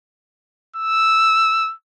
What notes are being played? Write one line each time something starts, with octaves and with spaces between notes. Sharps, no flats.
E6